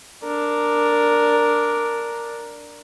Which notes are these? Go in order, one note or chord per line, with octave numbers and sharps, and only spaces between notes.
D4 A#4